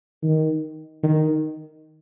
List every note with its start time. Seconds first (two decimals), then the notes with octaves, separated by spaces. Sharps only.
0.23 D#3
1.03 D#3